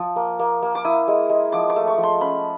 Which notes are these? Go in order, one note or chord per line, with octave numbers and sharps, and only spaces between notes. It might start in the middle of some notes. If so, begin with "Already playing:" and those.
Already playing: F3
A#3
A#3
A#3
D6
E4 D#6
G#3
G#3
F3 D6
D6
A3
C#6
F3
C6
C#4 B5